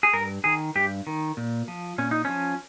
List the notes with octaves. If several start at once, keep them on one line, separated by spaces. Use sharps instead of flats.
G#4
G2 A#4
D#3 G#4
G2 G4
D#3
A#2
F3
A#2 C#4
D#4
F3 C#4